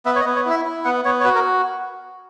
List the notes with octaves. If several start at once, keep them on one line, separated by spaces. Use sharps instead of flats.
B3 E5
C#5
D#5
B3
C#5
E4 E5
E4
B3 F#5
B3 C#5
C#5
F#4 B4
A#4